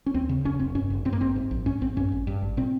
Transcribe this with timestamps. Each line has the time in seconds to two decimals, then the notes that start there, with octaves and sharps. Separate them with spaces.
0.06 C#4
0.14 D#2 C4
0.29 C#3
0.44 F1 C#4
0.59 F1 C4
0.75 G2 C#4
0.90 G1
1.05 G2 C4
1.13 A#3
1.21 G1 C4
1.36 G#2
1.51 A#1
1.66 G#2 C#4
1.81 A#1 C4
1.97 G2 C#4
2.12 G#1
2.27 G2
2.42 G#1
2.57 A#2 C4